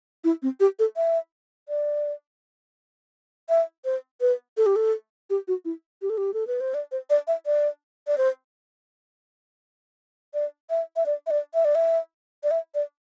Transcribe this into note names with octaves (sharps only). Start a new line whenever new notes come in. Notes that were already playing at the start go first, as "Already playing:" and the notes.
E4
C4
G4
A4
E5
D5
E5
C5
B4
A4
G4
A4
G4
F#4
E4
G4
A4
G4
A4
B4
C5
D5
C5
D5
E5
D5
D5
C5
D5
E5
E5
D5
E5
D5
E5
D5
E5
D5
E5
D5